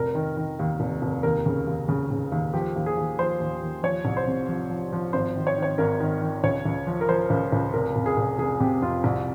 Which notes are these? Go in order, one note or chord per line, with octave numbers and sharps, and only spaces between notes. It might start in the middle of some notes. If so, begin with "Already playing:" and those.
Already playing: F1 A#4
D#3
D#3
D#2
F1
F1
D#2 A#4
C#3
D#2
C#3
C#3
D#2
F3 G4
D#2
G#4
D#2
F3 C5
D#2
D#2
F3 C#5
C2
C5
C3
F3
F3
F3
G#1 C5
D#3
C#5
D#3 C#5
G#1 A#4
D#3
D#3
C#2 C#5
C#2
F3
A#4
F3 C5
C#2
C#2
F1 A#4
F1
G#4
F1
F1 G#4
C3 G4
F2 F4
C2